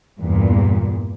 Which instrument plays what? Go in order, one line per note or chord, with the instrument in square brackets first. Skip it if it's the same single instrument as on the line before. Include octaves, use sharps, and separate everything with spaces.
[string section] E2 G2 A#2